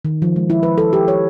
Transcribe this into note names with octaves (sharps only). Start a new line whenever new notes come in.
D#3
F3
G#3
E4
B4
A4
G4
C#5